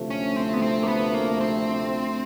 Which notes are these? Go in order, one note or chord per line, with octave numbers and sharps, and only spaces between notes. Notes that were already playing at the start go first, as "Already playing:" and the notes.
Already playing: D2 C3 F3 A3
C#4
C4
B3
C4
A#3
B3
A#3
C4